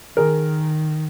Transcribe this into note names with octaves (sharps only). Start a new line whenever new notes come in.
D#3 G#4 A#4